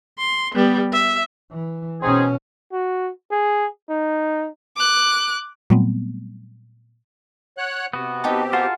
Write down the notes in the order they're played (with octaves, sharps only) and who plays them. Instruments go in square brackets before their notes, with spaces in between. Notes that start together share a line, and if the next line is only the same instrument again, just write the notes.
[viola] C6
G3 B3
E5
[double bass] E3
[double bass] B2 C#4 [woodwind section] C4 D#4 G#4
[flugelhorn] F#4
G#4
D#4
[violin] D6 F#6
[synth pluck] A#2 F#3 G3 A3 B3 C4
[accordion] C#5 F#5 F#6
[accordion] C3 [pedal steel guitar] B3 F#4
[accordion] B2 C4 G4 [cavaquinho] D#4 G5 A5
[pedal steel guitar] F4 A5 C6 [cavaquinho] F#4 G#4 A#4